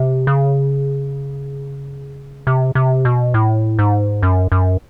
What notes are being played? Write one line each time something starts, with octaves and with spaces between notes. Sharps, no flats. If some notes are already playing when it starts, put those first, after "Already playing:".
Already playing: C3
C#3
C3
C3
B2
A2
G#2
F#2
F#2